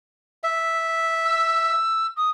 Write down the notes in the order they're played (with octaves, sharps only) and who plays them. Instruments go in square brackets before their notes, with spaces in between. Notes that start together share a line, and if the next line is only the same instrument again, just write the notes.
[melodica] E5
[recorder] E6
D#6